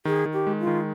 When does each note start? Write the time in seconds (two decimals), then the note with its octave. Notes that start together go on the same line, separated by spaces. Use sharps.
0.05 D#3 G#4
0.26 D#3
0.33 G4
0.47 G#3
0.60 F4
0.67 D#3